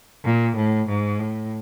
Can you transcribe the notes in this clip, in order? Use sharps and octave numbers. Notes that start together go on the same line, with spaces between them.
A#2
A2
G#2
A2